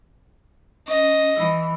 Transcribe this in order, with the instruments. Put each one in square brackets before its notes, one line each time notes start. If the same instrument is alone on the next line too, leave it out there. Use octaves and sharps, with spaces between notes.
[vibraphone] C#4 [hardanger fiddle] D#5
[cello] E3 [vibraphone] B5 E6